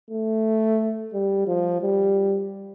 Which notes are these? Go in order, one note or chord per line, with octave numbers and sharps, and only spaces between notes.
A3
G3
F3
G3